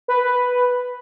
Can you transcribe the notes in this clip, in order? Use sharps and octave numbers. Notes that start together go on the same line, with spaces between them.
B4